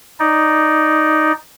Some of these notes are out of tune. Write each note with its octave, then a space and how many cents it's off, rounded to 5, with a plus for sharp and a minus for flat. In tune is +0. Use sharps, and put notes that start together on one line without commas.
D#4 +0 D5 +0